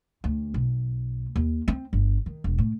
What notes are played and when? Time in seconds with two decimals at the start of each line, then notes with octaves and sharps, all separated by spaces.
0.24 D2
0.54 B1
1.36 D#2
1.68 C4
1.93 G1
2.26 D#3
2.44 E1
2.58 A2